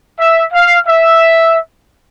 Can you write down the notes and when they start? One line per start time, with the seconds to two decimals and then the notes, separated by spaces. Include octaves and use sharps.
0.19 E5
0.53 F5
0.87 E5